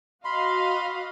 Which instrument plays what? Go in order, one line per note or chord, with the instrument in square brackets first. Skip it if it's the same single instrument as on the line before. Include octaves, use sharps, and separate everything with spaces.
[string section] F#4 D#5 F5 [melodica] B5 C6